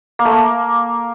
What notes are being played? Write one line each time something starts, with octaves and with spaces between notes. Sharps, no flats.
A#3
A3
A#3